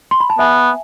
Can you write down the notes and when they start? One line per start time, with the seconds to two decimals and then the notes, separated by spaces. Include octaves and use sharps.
0.11 C6
0.20 B5
0.30 A5
0.39 B3 E5 G#5